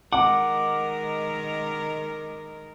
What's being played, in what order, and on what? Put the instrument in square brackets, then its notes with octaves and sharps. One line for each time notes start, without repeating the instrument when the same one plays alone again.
[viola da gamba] D#3 G#3 A#4 [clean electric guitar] F#5 [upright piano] D6